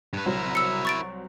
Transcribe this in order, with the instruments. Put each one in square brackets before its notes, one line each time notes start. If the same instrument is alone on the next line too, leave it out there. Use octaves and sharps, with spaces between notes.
[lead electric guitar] G2 B4
[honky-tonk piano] C2 F#3 C5 [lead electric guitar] E4 A#4
[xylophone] E6 C#7
C#6 A6 D7